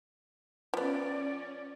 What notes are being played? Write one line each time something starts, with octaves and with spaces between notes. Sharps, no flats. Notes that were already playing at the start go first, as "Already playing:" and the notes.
F3 B3 C#4 D5